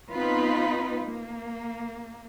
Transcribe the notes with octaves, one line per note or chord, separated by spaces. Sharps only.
B3 C4 D#4 F4 B4
A#3